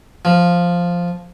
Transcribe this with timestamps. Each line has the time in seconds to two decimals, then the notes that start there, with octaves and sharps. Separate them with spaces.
0.25 F3